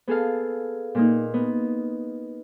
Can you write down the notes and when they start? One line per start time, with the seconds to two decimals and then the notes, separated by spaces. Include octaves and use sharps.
0.07 B3 G#4 A4 F5
0.95 A#2 A#3 D#4
1.34 B3